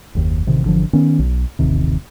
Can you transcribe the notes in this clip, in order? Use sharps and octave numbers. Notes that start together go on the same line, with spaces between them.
F#1 D#2
A1 C3 D#3
G#1 D3 E3 F3
D#3 B3 C#4
B1
D#1 A1 D#2 C3